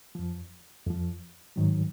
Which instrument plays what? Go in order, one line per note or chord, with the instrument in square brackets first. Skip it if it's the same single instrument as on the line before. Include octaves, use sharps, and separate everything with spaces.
[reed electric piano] F2 F3
F2 F3
G#2 D#3 F#3